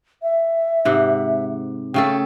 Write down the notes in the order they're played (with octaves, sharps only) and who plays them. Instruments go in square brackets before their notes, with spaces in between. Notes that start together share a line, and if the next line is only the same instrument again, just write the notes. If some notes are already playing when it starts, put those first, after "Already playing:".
[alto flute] E5
[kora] G#2 C3 F#5
[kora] C#3 A3 A4 [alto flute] G5